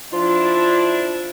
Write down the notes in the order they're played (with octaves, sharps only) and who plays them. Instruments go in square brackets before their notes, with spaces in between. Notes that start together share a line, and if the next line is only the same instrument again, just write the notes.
[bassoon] F3 [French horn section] D4 E4 [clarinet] F4